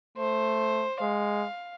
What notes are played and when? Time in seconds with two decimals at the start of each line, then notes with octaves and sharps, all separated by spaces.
0.18 A3 C5
1.01 G#3 F5